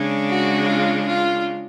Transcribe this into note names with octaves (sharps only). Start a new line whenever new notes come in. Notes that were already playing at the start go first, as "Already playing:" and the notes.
Already playing: C#3 G#3 D4
F#4
F4
F4